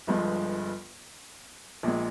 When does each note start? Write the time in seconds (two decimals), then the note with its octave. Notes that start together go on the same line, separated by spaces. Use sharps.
0.07 G1 G2 F3 G#3
1.83 A#1 A#2 G#3